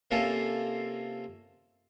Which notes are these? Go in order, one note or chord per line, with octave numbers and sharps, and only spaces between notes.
C3 A#3 C#4 F4 A4